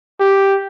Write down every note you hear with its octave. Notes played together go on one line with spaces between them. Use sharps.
G4